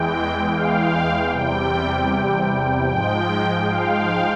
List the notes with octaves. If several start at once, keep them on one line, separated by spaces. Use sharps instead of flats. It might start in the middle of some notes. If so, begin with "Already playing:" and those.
Already playing: E2 E3 G#3 G5
F5
E2 C3 G3 G5
G#2 F3 G#3 G5
F5